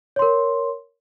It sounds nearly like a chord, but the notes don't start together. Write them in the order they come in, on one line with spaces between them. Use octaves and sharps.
C#5 C6 A#4